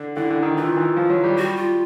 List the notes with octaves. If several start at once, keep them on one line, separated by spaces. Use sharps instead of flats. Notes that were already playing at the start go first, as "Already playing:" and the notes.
Already playing: D3
D3 E4
D3
D#3
E3 F4
D#3
E3
F3
F#3
G3
G3 F#4
F4